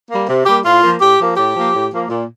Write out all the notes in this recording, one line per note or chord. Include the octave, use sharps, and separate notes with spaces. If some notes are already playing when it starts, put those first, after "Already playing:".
G3 A#3
C3
G3 A#3 G4
A2 F4
F3 A#3
A2 G4
F3 A#3
A2 G4
F3 A#3
A2
F3 A#3
A#2